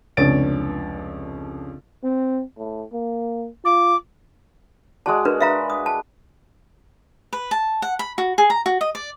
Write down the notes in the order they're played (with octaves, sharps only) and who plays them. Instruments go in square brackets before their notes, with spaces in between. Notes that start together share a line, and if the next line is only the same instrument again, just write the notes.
[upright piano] F1 C#2 D4 C#5 A6 D7
[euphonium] C4
A2
A#3
[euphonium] F4 [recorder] D6
[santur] G#3 F#4 D5 [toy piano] A5
[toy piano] D4 A#4 B4
[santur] B4 [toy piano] E5 F5 A#5
[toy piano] D#6
A5
[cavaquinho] B4
A5
F#5
B5
F#4
G#4
A#5
F#4
D#5
D5